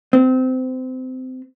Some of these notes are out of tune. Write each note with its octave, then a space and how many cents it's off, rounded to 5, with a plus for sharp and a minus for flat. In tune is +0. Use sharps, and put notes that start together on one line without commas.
C4 -25